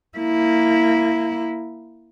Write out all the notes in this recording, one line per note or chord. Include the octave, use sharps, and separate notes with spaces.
A#3 E4